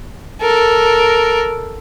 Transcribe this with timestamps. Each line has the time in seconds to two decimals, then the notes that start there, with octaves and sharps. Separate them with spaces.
0.41 A4 A#4